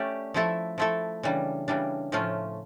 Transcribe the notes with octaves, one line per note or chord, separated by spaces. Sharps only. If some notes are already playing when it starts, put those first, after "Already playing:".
Already playing: A3 C#4 G4 D5
F3 A3 E4 A4
F3 A3 E4 A4
C#3 E3 G3 D4
C#3 E3 G3 D4
A2 F3 A3 C#4 F4